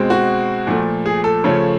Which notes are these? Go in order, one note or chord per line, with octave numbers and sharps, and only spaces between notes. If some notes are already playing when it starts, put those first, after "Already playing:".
Already playing: B2 G#3 C4
F#4
A#2 F3 A3
G#4
A4
C#3 F3 A3 C#4